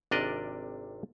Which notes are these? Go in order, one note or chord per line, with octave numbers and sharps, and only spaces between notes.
G#1 C3 D4 A#4 D5 D#5